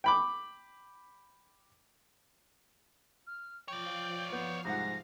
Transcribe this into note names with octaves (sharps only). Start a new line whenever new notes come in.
G5 B5 D6
F6
F3 C#5 D5 F5 G5
B3 G6
C2 G#2 F#5 A#6